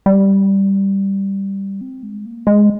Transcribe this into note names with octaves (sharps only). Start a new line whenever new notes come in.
G3
C4
G#3
A#3
G#3